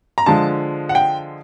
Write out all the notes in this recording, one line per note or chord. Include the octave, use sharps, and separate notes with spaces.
A#5
D3 F3 G#3 A5
F#5
G5